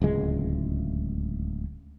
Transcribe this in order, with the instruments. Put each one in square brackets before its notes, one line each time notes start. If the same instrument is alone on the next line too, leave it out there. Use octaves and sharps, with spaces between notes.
[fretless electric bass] D1 C#2 G#3